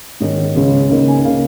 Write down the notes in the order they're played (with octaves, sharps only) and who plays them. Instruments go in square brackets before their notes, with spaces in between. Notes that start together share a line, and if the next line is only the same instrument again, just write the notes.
[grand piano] G#2 D#3 C#4 D#5
C#2 C#3 G#3 C#4
C#2 C#3 A#3 D#4 D#5
G#5
C#3 A#3 F5